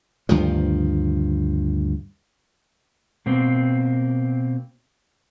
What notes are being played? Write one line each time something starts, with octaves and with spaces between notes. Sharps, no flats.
D2 G2 D#3 F3
B2 A#3 C4